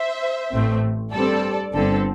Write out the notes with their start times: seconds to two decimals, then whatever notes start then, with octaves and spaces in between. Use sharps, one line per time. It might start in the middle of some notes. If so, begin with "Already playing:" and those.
Already playing: C5 E5
0.53 A1 A2 A3 C4
1.13 G2 G3 C4 A4 D5
1.74 G1 G2 D3 C4 A4